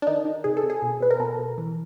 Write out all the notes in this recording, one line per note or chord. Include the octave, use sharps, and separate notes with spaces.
D4
D#3 D#4
D#3
C3 G#4
A4
C3
G#4
B2
B2 B4
A#4
B2 A4
B2
E3